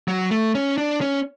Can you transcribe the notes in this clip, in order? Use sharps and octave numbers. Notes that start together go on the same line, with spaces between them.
F#3
A3
C#4
D4
C#4